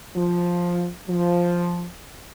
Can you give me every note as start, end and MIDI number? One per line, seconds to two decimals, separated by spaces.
0.16 0.87 53
1.09 1.86 53